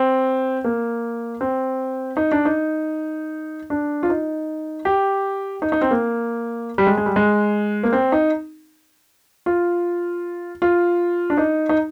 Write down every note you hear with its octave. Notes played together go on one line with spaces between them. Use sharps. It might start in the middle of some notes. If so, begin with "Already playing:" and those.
Already playing: C4
A#3
C4
D#4
D4
D#4
D4
F4
D#4
G4
D#4
D#4
C4
A#3
G3
G#3
G#3
G3
G#3
A#3
C4
D#4
F4
F4
D4
D#4
D#4